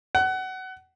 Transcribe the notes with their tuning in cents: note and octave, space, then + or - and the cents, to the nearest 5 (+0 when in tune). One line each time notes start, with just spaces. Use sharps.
F#5 +25